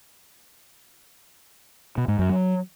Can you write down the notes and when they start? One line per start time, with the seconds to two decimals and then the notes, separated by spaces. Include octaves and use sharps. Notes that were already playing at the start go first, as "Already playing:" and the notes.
1.98 B2
2.08 G#2
2.19 F#2
2.29 F#3